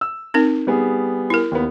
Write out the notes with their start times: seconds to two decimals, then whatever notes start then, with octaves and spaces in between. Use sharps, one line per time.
0.01 E6
0.34 C4 D#4 A#4
0.67 G3 B3 G#4
1.30 E4 A#4
1.51 D#2 B3